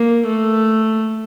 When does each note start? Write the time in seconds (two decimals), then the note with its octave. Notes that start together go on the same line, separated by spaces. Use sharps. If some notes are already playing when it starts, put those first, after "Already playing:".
Already playing: A#3
0.26 A3